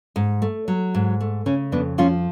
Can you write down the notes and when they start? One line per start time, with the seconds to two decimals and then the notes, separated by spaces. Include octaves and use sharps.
0.16 G#2
0.42 A3
0.68 F#3
0.95 G#2
1.20 A3
1.46 C#3 C#4
1.72 F2 B3 D4
1.98 F3 C#4 F4